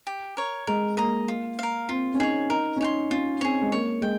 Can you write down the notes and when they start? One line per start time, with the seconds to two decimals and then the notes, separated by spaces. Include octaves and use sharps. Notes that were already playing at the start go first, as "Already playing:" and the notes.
0.07 G4
0.37 A#4 C#5
0.67 G#3 A#4
0.97 A#3 D#5 A#5 D#6
1.28 F4
1.59 A#4 F5
1.89 C4 F4
2.14 C#4
2.19 D#4 G#4 C#5
2.50 D#4 A#4
2.76 C#4
2.80 D#4 C#5 G5 C6
3.10 C#4 F4
3.41 C4 G#4 C#5
3.61 G#3
3.72 A#3 C#5
4.02 G#3 G5